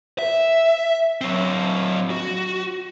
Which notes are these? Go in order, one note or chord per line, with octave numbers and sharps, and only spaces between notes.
E5
F#3 C4
F#4